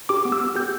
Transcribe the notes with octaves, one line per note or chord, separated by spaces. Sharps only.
G4 D6
B3
E6
B3
G4 G6